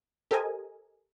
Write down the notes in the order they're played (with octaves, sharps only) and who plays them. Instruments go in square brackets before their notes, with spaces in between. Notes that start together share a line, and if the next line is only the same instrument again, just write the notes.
[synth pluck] G4 A4 A#4 C5 D#5 G#5